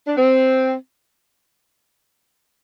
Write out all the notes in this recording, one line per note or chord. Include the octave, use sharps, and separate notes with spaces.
D4
C4